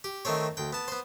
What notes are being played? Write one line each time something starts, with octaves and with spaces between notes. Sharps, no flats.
G4
D#3 A3 C4 C#5
D2 G5
B3 A5
B3 C5